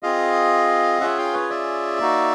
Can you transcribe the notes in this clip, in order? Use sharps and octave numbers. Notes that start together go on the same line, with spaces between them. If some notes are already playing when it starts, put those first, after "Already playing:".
C4 F4 G#4 D#5 F5
C#4 F4 G#4 E5 F#5
F5 G5
B4 C#5
D5 E5
A#3 D#4 F#4